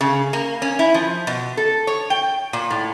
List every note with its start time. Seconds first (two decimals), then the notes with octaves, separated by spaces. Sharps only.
0.01 C#3
0.33 A#3
0.62 C#4
0.79 E4
0.94 F3
1.27 B2
1.57 A4
1.87 C#5
2.10 G5
2.53 A#2
2.70 A2